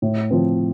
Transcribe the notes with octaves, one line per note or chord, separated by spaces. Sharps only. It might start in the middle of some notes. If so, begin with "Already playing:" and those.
A2
F3 C4